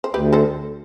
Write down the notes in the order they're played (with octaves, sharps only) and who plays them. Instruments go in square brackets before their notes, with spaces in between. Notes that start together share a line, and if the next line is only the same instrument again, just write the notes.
[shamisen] C5
[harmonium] D2 [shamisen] G4 B4
[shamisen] A4 C5